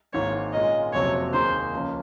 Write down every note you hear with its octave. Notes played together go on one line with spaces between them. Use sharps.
G#1 G#2 D#3 A#3 C#5
A#2 G#3 C#4 F4 A#4 D#5
F#1 F2 C3 F#3 C#5
D#2 D#3 A#3 D#4 G#4 C5
C#2 C#3 F3 A#3 C#4